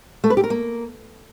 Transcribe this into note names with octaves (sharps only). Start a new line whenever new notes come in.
A3
B4
G4
A#4
A#3